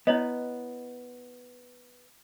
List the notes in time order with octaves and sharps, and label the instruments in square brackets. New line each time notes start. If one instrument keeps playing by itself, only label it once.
[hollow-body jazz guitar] B3 [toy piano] E4 C#5 D#5